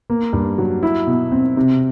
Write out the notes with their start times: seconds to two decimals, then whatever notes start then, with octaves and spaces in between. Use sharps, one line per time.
0.10 A#3
0.33 G2
0.58 F#3
0.83 E4
1.07 B2
1.32 C4
1.57 C3